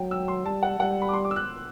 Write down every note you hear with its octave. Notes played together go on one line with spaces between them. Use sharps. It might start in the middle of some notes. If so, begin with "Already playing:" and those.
Already playing: F#3 G5
E6
C6
G3 A5
F#5
G3 F#5
G5
B5
D6
C6
D6
E6
F#6